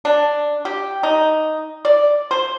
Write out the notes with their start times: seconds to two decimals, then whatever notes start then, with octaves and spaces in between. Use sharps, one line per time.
0.05 D4
0.65 G4
1.03 D#4
1.85 D5
2.31 C5